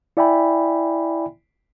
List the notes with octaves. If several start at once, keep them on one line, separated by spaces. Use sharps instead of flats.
E4 D5 E5 G5 G#5 B5